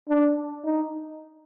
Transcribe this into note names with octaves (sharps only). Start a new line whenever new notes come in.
D4
D#4